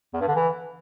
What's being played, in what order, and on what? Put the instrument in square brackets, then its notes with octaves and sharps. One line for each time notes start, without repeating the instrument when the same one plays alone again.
[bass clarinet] E2
G2
D3
E3